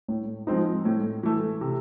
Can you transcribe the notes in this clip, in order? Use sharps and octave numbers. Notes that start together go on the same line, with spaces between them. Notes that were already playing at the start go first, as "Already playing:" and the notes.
A2
F3 G#3 C4 D#4
A2
E3 A3
C3